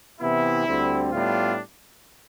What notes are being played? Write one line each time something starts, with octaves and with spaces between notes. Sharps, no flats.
C3 E3 B3 E4
D2 D3 G3 C4
A2 G3 B3 D4 F4